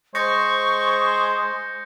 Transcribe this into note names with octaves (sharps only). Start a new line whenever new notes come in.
G#3 C5 C#6 G6 A#6 C#7